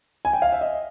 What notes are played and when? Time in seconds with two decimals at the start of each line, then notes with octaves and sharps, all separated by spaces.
0.25 G#5
0.33 G5
0.42 F5
0.52 E5
0.61 D#5